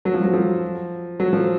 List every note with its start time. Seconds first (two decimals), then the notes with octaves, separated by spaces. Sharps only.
0.05 F#3
0.14 F3
0.24 F#3
0.33 F3
1.20 F#3
1.33 F3